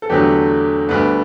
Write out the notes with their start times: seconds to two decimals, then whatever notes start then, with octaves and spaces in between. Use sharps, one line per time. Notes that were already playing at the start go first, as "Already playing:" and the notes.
0.02 A4
0.09 E2 D3 F#3 A3 G4
0.89 D2 D3 G3 B3